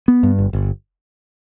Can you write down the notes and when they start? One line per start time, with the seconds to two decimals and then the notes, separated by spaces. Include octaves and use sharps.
0.08 B3
0.23 G2
0.39 G1
0.53 G1